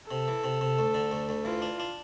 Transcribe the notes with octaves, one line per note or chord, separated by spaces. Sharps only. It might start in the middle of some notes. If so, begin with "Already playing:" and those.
C3 A4
E3
C3
C3
D2
D3
D2
D2
E3 F4
D4
D4